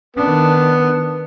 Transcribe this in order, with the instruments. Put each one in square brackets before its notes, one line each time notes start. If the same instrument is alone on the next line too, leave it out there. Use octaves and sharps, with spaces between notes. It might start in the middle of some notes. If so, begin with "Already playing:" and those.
[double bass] D#3 D4 [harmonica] B3